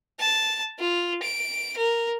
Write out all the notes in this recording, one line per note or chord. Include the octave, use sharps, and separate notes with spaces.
A5
F4
D7
A#4